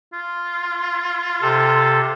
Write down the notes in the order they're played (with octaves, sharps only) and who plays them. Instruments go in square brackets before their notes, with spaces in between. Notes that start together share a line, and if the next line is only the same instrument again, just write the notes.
[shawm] F4
[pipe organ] C3 A4